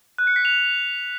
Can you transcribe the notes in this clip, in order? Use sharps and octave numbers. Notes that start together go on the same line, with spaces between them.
F#6
C#7
B6
F7